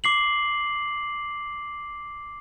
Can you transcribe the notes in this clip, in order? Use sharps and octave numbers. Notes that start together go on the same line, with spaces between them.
D6 C7 F#7